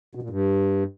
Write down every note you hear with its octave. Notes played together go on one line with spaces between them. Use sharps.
B2
A#2
G2